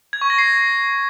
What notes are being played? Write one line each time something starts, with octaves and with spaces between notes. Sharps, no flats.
G#6
C#6
A#6
C7